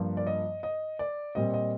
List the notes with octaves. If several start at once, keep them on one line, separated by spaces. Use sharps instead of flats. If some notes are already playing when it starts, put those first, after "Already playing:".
Already playing: G2 F3 A#3 F4
D5
D#5
D#5
D5
A#2 G3 C4 D#5
D#5